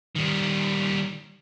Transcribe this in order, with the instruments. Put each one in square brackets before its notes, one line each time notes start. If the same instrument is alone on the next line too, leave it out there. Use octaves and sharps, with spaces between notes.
[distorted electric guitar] D#3 G3